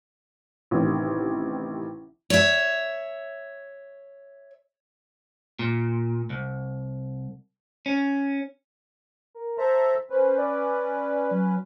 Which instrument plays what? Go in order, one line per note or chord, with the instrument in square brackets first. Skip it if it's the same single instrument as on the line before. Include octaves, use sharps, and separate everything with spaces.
[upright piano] A1 C3 D#3
[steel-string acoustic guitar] C#5 E5
[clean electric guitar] A#2
C2
C#4
[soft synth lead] A#4
[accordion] A4 E5 A#5 [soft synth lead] C5
[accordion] C#4 B4 [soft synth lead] C5
[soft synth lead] D5
F#3